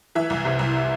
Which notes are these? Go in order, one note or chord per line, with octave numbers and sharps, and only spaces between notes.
E3 E5
C2
C3
C2